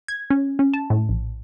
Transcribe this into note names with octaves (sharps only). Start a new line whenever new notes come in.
G#6
C#4
C#4
A5
A2
A#1